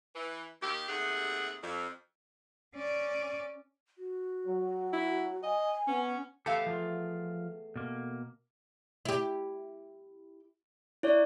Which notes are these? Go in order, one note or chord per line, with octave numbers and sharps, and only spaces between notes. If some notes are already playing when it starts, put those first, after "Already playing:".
E3
D#2 G4
D#2 C3 A3 G#4 F#5
F2
C#4 D5
F#4
F#3
E4
D#5 G#5
B3 C#4
E2 A3 G4 A4 F5
F3 F4
B2 A#3
E4 G4
E4 C#5 D5